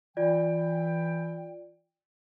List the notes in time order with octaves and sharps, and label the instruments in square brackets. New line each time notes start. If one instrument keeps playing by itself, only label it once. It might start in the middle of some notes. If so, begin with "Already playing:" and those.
[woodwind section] E3 G5 [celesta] F4 D5